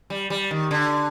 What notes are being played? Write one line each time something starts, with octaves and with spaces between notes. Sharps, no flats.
G3
G3
D#3
D3